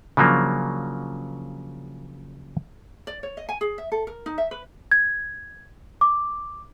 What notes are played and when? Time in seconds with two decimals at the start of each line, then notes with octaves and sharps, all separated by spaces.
0.17 C#3 F3 F#3 A#3 D4
3.07 D5
3.23 C#5
3.37 D#5
3.49 G#5
3.61 G#4
3.78 E5
3.92 A4
4.07 A#4
4.26 D#4
4.38 E5
4.51 B4
4.91 G#6
6.01 D6